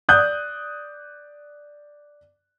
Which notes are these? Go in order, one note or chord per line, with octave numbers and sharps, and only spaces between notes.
D5 D#6 F#6 G6